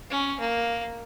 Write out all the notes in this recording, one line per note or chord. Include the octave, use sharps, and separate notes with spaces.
C#4
A#3